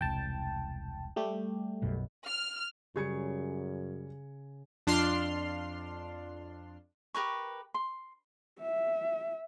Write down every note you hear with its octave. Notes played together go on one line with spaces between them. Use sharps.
E1 C2 G5 A5
G3 A3 G4
B1 F#2 B2
F6
F#2 C#3 G3 G#6 C#7
F2 D4 F4 C6 F6 C7
G4 A#4 B4 C#6
C6
E5